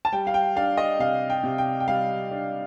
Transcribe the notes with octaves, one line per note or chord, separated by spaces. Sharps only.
A5
G3 G5
F5
G5
D4 F5
D#5
C3 F5
G5
C3
G5
G5
G3 F5
D4